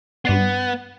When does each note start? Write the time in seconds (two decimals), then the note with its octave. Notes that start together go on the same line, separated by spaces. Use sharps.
0.25 G2 B3 D5 C6